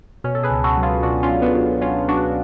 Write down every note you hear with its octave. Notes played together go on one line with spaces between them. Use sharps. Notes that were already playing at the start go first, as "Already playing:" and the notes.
B2 C#4
A4
G#4 B4
C#2
F#4 A4
F#3
F4 G#4
B2 D4 F#4
C#4 F4
F#3
B3 D4
F#3
F#3 C#4 F4
F#3 D4 F#4